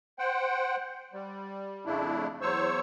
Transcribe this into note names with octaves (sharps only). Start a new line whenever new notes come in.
C5 F#5 G5
G3
F2 C#3 A3 D4 E4
E2 F#3 C5 C#5 C#6 E6